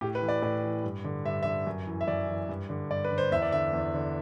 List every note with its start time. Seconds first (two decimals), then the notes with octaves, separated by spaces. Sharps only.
0.01 A2 G4
0.15 B4
0.22 E3
0.28 D5
0.42 A2 D5
0.63 E3
0.84 G2
1.05 D3
1.25 G2 E5
1.43 D3 E5
1.67 F#2
1.87 E3
2.01 E5
2.08 F#2 D5
2.28 E3
2.49 G2
2.70 D3
2.90 G2 D5
3.05 B4
3.11 D3
3.18 C5
3.32 E2 E5
3.42 D5
3.52 D3 E5
3.73 E2
3.94 D3